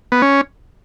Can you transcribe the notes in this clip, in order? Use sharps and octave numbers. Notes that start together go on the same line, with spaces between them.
B3
C#4